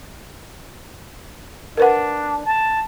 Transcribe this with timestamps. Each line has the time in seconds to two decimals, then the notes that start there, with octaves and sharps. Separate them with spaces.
1.77 D4 A#4 B4 F#5
2.45 A5